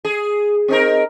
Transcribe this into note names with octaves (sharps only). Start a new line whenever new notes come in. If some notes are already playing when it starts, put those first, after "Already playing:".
G#4
C4 D#4 A#4